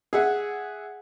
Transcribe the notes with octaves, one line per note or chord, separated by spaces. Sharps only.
G#4 E5 F#5